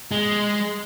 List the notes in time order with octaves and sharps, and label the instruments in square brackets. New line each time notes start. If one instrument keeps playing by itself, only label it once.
[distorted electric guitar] G#3